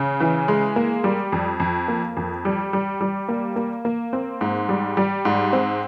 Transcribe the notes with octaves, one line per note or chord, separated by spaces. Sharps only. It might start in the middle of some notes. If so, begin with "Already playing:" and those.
Already playing: C#3
E3
G#3
A#3
G3
F2
F2
A#3
F2
G3
G3
G3
A#3
A#3
A#3
C4
G#2
G3
G3
G#2
C4